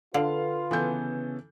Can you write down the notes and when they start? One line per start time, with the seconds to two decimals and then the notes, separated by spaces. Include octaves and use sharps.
0.14 D3 F4 B4 F5
0.71 C#3 E3 B3 A4 G6